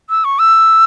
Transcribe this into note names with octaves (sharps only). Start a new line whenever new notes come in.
E6
C#6
E6